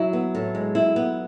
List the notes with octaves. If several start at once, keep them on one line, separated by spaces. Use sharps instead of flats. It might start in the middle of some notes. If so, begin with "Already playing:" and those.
Already playing: F#3 E4
B3
A2
G#3
E4
B3